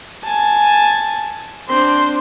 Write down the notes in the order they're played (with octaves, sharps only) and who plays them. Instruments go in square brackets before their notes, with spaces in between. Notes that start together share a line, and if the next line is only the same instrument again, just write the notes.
[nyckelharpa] G#5 A5
[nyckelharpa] C4 D4 [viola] C5 C6